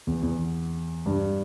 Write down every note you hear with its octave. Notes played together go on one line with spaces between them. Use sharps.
E2
E2
G2